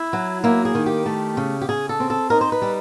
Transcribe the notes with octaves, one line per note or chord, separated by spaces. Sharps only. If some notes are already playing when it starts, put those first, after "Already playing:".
Already playing: E4
F#3
A#3 E4
G#4
D#3
G4
A3
C#3
G4
C#3 G#4
A4
C4
A4
D#4 A#4
C5
B4
G3